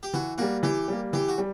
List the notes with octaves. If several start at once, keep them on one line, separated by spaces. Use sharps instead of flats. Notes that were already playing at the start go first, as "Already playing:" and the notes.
G4
E3 F#4
G3 A#3 F#4
E3 G4
G3 A#3
E3 G4
F#4
G3